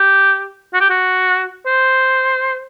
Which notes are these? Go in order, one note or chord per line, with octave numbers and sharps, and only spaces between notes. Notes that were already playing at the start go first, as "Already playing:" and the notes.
Already playing: G4
F#4
G4
F#4
C5